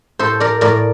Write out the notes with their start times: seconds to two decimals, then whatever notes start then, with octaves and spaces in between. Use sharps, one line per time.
0.19 A2 A4 C5
0.40 A#4 D5
0.61 A2 A#4 D5